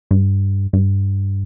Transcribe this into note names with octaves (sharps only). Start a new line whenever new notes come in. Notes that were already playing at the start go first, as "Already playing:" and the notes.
G2
G2